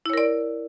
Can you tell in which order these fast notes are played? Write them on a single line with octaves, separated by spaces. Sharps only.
E4 C#5 A#4 D5